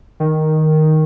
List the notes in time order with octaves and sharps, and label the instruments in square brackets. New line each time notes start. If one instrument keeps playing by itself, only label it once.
[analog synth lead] D#3